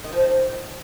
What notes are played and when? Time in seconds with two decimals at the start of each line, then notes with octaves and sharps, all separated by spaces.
0.04 D#3
0.13 F3
0.20 D#3